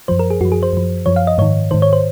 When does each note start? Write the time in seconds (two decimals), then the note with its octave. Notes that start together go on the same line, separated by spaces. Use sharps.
0.08 F#2 F3 C5
0.19 A#4
0.30 G#4
0.41 F#2 F#4
0.45 F3
0.52 G#4
0.63 C5
0.73 F#2 F3
1.06 F#2 F3 C#5
1.16 F5
1.27 D#5
1.38 G#2 D#3 C#5
1.71 G#2 D#3 C5
1.82 C#5
1.93 C5